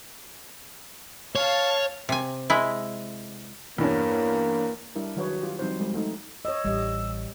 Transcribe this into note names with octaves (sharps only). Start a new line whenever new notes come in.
C#5 F5 A5 F6
C3 G#5
G#3 E4
E2 G2 A#3 C#4
G3 D4 E4 A#4
D#3 F#3 F#4 G#4 B4 C#5
F4 G4
F3 G3 C4 D#4 F#4 C5
G3 G#3
A3 D#4
C#5 D#5 E6
A1 G3 D#5